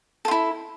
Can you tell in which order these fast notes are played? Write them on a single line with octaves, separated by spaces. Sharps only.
A4 F4 E4